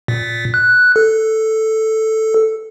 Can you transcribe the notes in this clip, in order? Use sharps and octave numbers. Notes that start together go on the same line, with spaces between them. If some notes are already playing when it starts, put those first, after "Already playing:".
A#2
F#6
A4